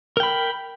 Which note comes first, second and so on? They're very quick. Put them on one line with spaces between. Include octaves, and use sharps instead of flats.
A#4 G5 B5